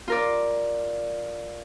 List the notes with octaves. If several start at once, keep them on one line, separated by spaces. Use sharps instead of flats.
F4 A#4 D5